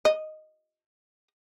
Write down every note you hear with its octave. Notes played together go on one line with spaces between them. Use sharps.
D#5